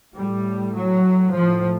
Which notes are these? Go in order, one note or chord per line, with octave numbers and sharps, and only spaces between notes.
A2 G3
F#3
A2 F3